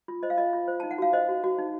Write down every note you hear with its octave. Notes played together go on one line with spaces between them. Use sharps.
F4
C5 D#5
F5
F4 D#5
F4
C5
D#4 A5
F#5
F#4 F5
C5 D#5
F#4
F#4
D#4